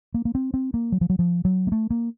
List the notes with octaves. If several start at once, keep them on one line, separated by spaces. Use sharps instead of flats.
A#3
A#3
C4
C4
A#3
F#3
F3
F#3
F3
F#3
A#3
A3
A#3